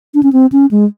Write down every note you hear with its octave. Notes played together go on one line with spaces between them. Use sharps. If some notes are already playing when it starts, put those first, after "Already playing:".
D4
C#4
C4
C#4
G#3